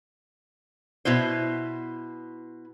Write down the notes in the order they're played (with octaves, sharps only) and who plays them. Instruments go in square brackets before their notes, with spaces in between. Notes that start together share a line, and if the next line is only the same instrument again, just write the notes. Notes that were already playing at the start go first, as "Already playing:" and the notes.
[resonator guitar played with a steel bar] B2 E4 B4 C5